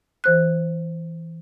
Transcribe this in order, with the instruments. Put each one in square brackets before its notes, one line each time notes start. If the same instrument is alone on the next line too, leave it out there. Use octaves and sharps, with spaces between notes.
[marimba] E3 C5 F#6